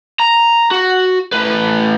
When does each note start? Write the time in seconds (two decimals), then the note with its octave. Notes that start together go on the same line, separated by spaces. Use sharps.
0.20 A#5
0.71 F#4
1.32 A2 B4